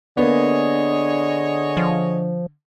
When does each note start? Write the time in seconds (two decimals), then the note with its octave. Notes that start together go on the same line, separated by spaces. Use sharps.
0.17 D3 A#3 B3 G#4 C#5 D#5
1.77 F3